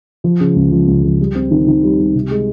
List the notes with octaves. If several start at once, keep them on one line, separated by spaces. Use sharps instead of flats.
F3
C#3
C#2
F3
C#2
F3
G3
C4
D#3
D#3
G3
G3
C3
G#3